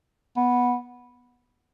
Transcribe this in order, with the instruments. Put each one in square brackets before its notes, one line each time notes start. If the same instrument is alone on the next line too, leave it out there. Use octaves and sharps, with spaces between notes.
[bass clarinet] B3